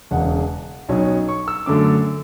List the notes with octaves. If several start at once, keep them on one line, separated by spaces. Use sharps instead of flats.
E1 E2 C#3 F#5
B1 B2 F#3 C#4
C#6
E6
F#2 D3 A3 D6